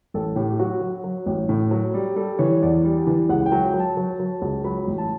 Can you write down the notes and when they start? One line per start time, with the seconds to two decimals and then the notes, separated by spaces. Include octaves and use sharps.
0.14 A1 A4
0.36 A2 G4
0.49 G4
0.59 F#3 F#4
0.81 F#3
1.04 F#3
1.26 A1
1.49 A2
1.71 F#3
1.94 G3
2.16 G3 A4
2.39 E3 C#5
2.62 E2 D5
2.85 G3
3.07 E3
3.29 C#2 F#5
3.46 G5
3.52 F#3
3.64 G5
3.74 F#3
3.80 A5
3.97 F#3
4.20 F#3
4.42 C#2
4.64 F#3 B5
4.87 A1
4.98 A5